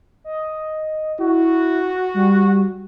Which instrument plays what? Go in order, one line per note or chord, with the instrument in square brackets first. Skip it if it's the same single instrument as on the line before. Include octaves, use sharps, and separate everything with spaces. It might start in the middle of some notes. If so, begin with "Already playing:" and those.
[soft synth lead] D#5
[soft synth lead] E4 [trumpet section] F#4
[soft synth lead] G3